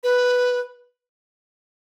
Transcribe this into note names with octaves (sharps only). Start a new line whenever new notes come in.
B4